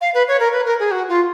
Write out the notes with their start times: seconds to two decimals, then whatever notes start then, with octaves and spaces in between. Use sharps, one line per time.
0.01 F5
0.14 B4
0.28 C#5
0.39 A#4
0.52 B4
0.65 A#4
0.79 G#4
0.91 F#4
1.08 F4